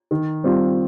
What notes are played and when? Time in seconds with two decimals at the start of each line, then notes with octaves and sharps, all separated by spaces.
0.11 D#3
0.44 G3 C4 F4